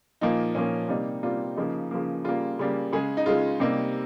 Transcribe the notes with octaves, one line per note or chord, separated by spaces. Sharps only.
A#2 F3 A#3 D#4
A#2 F3 A#3 C#4
C3 G3 A#3 D#4
C3 G3 A#3 F4
C#3 F3 A#3 D#4
C#3 F3 A#3
C#3 G3 A#3 F4
C#3 G3 A#3
C#3 G#3 G#4
D#4
C#3 G#3 F4
C3 G3 A#3 D#4